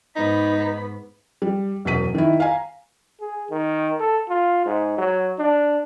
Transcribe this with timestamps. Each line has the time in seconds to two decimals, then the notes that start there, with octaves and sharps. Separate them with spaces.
0.16 G#2 B3 D#4 B5
1.42 G3
1.85 E1 F#2 F#3 B6 D#7
2.15 D#3 E4
2.40 F5 G#5 A#5
3.21 G#4
3.50 D#3
4.00 A4
4.29 F4
4.66 G#2
4.98 F#3
5.39 D4